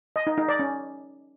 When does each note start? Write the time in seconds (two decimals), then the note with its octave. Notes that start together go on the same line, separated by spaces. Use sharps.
0.16 D#5
0.27 D#4
0.38 D#4
0.48 D5
0.59 C#4